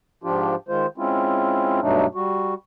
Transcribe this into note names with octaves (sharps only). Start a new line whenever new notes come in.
G#2 F3 D4 F4 G4
D#3 G#3 F4 C5
G#3 C4 C#4 E4 F4
G2 B2 F#3 A3 D4 D#4
G3 F#4